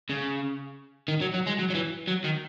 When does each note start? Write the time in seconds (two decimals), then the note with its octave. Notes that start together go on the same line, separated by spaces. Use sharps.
0.09 C#3
1.08 D#3
1.21 F#3
1.34 F#3
1.46 G#3
1.59 F#3
1.70 F#3
1.75 E3
2.08 F#3
2.25 D#3